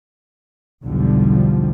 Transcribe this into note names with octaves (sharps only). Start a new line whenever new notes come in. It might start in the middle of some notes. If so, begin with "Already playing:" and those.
B1 E2 B2 D3 F3 G3